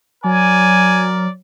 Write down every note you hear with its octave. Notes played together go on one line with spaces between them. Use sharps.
F#3 A#4 D5 G#5